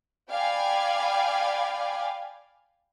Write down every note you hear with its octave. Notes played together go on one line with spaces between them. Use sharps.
D5 F5 G5 G#5 B5